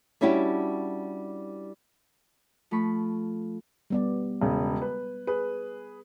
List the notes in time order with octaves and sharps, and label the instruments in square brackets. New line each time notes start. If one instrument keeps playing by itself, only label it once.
[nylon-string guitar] G3 C#4 D4 E4 F#4 G4
[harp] F3 A3 B5 C#6
[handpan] G3 B3 D5
[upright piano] E1 C#3
B4
G#4 B4